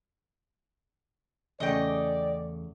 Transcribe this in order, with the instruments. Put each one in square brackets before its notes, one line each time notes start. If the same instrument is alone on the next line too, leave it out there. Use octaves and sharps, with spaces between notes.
[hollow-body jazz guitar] E2 C#3 A3 [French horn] D5 [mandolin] D#5 G5